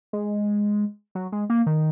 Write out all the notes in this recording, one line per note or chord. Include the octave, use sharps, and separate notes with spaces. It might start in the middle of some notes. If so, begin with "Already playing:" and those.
G#3
F#3
G#3
A#3
D#3